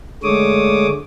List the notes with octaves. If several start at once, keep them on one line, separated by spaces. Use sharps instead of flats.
D3 G#3 A3 C#5 D6 D#6